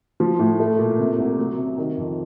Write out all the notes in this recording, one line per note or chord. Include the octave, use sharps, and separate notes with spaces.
F3
A2
A3
A#2
C3
C2
F#3
C3
D#3
F2